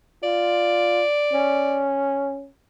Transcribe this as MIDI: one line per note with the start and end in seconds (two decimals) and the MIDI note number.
0.23 1.03 65
0.23 1.83 74
1.33 2.48 61